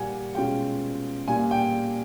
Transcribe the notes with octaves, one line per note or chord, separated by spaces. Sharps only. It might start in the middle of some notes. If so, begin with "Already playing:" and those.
Already playing: A#2 G3 A#3 F#5 G#5
B2 G#3 C#4 F4 G5
A#2 G3 A#3 G#5
G5